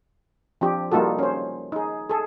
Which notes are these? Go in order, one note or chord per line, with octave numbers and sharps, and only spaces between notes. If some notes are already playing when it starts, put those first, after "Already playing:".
F3 C4 D4 G4
G3 A#3 D#4 F4 F#4 A4
C#4 C5
D#4 G#4
G#4 A4